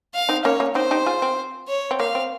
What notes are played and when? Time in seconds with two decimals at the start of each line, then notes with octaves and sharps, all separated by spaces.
0.14 F5
0.29 C4 D#4
0.44 A#3 C#4 C#5
0.60 A#3 C#4
0.75 C4 D#4 C5
0.91 D#4 G4
1.06 F4 G#4
1.22 C4
1.68 C#5
1.91 C4
2.00 A#3 F5
2.15 C4